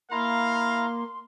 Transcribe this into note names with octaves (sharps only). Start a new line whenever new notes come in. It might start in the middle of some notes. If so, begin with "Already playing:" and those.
A#3 E4 F5 A#5 C6